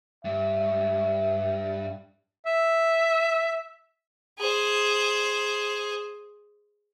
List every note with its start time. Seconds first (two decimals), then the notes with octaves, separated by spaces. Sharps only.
0.25 G2 E5
2.46 E5
4.39 G#4 C5